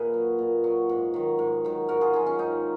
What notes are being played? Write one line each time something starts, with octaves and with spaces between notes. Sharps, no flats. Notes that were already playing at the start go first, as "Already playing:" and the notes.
Already playing: A#2 G#4 B4
F#3
A#2
F#3
G#2
D#3 F#3
G#2
D#3 F#3
G#2 F#4 A#4
F4 G#4
D#3 F#3 F4 G#4
C#4
G#2 D#4